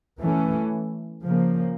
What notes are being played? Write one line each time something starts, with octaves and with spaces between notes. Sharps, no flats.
E3 A3 C#4
C#3 F3 A#3